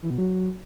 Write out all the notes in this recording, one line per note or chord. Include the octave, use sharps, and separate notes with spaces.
E3
B2
F#3